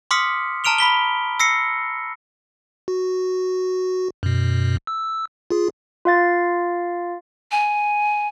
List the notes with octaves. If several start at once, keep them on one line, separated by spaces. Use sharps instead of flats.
C6 D6 D#6 F6 B6 C#7
A5 A#5 F6 D7 F7 G7
B5 B6 G7
E6 A#6 C7 C#7
F#4
F#2 B2
E6
F4 G#4
F4 F5 A6
G#5